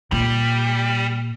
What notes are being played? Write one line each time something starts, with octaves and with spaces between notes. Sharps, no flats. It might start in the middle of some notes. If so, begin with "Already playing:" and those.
A#2 G3